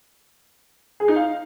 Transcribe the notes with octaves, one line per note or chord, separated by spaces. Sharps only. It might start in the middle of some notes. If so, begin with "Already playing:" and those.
G#4
D#4
F5